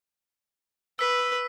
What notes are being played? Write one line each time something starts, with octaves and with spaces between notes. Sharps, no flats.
B4 E6 B6